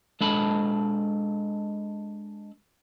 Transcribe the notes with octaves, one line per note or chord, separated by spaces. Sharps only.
G#3 D4 A4 A5 B5